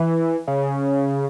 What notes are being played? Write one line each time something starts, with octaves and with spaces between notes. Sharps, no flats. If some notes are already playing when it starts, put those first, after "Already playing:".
Already playing: E3
C#3